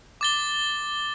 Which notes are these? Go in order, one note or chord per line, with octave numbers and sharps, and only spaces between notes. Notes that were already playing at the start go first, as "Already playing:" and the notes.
D6 A6 G7